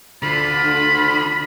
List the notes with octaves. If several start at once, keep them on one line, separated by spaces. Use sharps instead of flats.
D2 D3 F4 B5